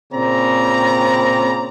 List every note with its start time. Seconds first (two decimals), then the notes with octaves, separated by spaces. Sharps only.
0.13 A#2 C#3 C4 D5 A#5